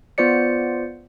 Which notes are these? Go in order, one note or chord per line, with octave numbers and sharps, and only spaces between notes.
B3 F4 C5 D5 C#7